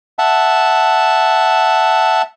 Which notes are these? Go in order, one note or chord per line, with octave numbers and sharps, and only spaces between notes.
E5 F#5 A5